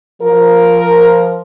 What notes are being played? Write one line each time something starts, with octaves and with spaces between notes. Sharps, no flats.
F3 A#4